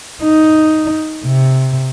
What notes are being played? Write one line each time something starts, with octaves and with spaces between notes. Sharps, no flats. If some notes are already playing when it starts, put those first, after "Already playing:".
D#4
C3